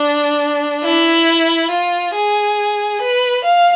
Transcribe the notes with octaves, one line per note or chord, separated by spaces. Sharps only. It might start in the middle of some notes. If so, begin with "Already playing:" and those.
Already playing: D4
E4
F4
G#4
B4
F5